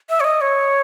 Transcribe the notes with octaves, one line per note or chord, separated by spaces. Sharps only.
E5
C#5
D#5
C#5